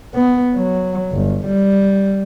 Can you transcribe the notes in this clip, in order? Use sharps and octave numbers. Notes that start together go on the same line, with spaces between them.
B3
F#3
G1
G3